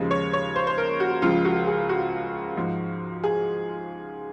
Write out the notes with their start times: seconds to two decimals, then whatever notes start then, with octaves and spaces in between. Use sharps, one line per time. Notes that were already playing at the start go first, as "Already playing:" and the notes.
Already playing: D#2 C#3 F3 G#3
0.11 C#5
0.33 C#5
0.56 C5
0.67 C5
0.78 A#4
1.00 F#4
1.22 C#2 C#3 F3 G#3 F4
1.45 F#4
1.67 G#4
1.89 F#4
2.57 G#2 F3 G#3
3.24 G#4